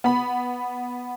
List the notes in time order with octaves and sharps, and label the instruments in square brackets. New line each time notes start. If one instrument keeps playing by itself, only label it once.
[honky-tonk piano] B3 B5